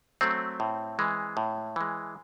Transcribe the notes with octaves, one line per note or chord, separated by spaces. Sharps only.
F#3 A3 C4
A2
E3 G#3
A2
E3 G#3